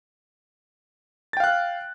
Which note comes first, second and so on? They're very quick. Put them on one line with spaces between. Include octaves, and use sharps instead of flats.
A6 G5 F5 F#6